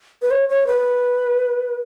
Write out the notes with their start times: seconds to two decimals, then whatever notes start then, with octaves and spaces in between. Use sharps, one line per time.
0.22 B4
0.31 C#5
0.49 C#5
0.67 B4